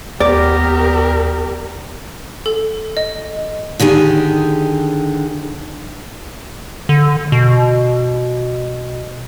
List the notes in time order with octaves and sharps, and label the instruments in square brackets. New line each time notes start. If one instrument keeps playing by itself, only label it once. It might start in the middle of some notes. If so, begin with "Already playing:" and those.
[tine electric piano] D#2 [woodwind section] B3 [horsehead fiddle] G4 A#4 [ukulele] D5
[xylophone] A4
D#5
[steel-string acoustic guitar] D3 D#3 G4 G#4
[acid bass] D3
B2